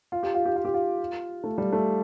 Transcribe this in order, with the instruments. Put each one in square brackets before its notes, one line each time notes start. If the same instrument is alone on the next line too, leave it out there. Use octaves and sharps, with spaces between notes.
[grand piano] F4
G4
F4
G4
F4
G4
F4
A3
G3
A3